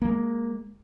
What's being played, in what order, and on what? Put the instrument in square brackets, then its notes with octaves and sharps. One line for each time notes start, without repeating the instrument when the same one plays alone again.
[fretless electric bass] G#3 A#3